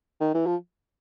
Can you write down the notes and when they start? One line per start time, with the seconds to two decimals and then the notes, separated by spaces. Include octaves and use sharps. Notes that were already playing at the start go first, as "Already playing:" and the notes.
0.21 D#3
0.34 E3
0.46 F3